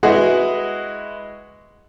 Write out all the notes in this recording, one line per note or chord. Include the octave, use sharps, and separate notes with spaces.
G#3 E4 F#4 G#4 B4 D#5